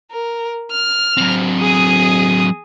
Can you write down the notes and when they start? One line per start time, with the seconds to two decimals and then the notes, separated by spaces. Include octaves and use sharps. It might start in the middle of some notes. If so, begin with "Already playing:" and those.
0.11 A#4
0.71 F6
1.17 F#3 C4
1.61 G#4 D#6